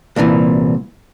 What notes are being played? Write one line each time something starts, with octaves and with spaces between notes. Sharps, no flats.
C2 A#2 D#3 E3